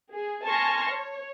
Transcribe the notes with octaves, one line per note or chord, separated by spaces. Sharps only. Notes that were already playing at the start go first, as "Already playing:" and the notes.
G#4
G#5 A5 C6 C#6 F6 A#6
C#5